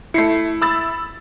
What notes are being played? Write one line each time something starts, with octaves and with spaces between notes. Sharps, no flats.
A3 E4 C7 C#7
B5 E6 A6